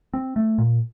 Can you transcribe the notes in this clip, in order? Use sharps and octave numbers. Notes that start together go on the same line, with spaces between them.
C4
A3
A#2